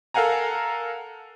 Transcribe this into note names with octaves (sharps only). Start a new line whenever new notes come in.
A4 A#4 F5 F#5 G#5 A#5